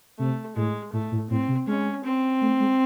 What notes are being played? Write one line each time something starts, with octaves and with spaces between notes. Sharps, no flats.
C3 A3
A2 G#3
A2 A3
A2
A2 C4
C3
G#3 C#4
C4
A3
G#3